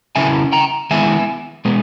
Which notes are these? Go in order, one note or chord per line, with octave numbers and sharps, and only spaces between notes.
C#3 G#3 C#4 E4 E5 G#5
G5 A#5
D#3 G#3 B3 E4 E5 G#5
B2 G#3 B3